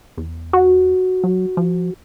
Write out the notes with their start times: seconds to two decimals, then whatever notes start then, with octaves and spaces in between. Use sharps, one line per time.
0.18 E2
0.53 F#4
1.24 F#3
1.57 F3